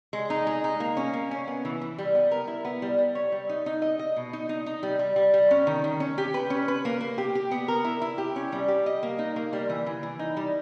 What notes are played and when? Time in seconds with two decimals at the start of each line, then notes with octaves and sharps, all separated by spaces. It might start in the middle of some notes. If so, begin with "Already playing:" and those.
0.13 G#3
0.30 D#4
0.47 G#3
0.64 D#4
0.80 A#3
0.97 C#4
1.14 A#3
1.31 C#4
1.48 B3
1.65 E3
1.81 E3
1.98 G3
2.15 B3
2.31 A#4
2.48 E4
2.65 B3
2.82 G3
2.98 G3
3.15 C#5
3.32 G3
3.49 D#4
3.66 D#4
3.82 D#5
3.99 D#5
4.17 B2
4.33 D#4
4.49 D#4
4.66 D#4
4.83 G3
4.99 G3
5.16 G3
5.34 G3
5.51 C#4
5.67 D#3
5.84 D#3
6.00 C#4
6.18 G4
6.34 B4
6.50 C#4
6.68 B4
6.85 A#3
7.01 A#3
7.18 G4
7.35 G4
7.51 B3
7.68 A#4
7.85 E4
8.02 E4
8.18 G4
8.36 C#4
8.52 G3
8.68 G4
8.86 D#5
9.03 A#3
9.19 D#4
9.36 A#3
9.53 G3
9.70 E3
9.86 E3
10.03 E3
10.19 D#4
10.37 G3